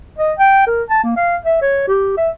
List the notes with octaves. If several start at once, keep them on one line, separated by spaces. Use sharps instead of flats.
D#5
G5
A#4
A5
A#3
F5
E5
C#5
G4
E5